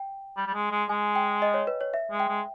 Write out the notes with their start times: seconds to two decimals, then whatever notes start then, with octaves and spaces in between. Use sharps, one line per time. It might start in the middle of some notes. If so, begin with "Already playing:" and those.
Already playing: G5
0.37 G3
0.47 G3
0.54 G#3
0.72 G#3
0.89 G#3 G#5
1.15 G5
1.42 D#5
1.54 C#5
1.67 B4
1.81 C#5
1.94 E5
2.11 G#3
2.20 G5
2.29 G#3